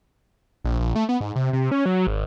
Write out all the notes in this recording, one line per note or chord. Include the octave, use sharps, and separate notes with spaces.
A#1
A#1
A3
B3
G#2
C3
C3
C#4
F#3
G#1